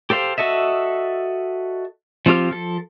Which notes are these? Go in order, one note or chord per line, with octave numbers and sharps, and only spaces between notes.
G4 A4 C5 F5
F#4 A4 D#5 E5
F3 C4 F4 G4 F6
F3 A4